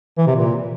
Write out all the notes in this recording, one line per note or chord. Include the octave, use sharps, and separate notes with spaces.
E3
C3
A#2